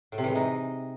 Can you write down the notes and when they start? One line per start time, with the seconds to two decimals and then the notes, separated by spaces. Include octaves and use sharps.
0.12 A2
0.18 C3
0.24 E3
0.29 G#3
0.35 D#4